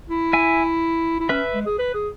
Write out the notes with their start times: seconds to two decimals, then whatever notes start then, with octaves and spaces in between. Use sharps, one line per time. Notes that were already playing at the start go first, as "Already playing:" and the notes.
0.10 E4
0.33 E5 G#5
1.20 E4
1.29 C#4 B4 E5
1.54 G#3
1.66 G#4
1.79 B4
1.94 G#4